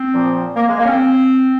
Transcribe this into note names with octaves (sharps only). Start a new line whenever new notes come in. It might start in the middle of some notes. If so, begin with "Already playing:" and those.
Already playing: C4
A#2 F3
A#3
G#3
A#3
C#4
C4